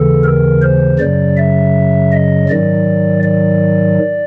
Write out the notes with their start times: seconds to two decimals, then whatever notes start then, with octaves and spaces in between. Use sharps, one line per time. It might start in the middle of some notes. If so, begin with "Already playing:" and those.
Already playing: D#2 C#3 E3 A4
0.24 A#4
0.62 C5
0.99 F#2 C#3 F#3 D5
1.37 E5
2.12 D#5
2.49 G#2 D#3 F#3 D5
3.23 D5